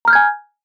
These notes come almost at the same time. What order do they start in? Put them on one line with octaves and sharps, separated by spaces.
A#5 F6 G6 G#6 G#5